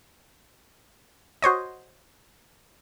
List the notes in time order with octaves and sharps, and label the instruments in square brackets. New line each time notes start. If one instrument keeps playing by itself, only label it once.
[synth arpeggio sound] F#4 C5 C#5 D#5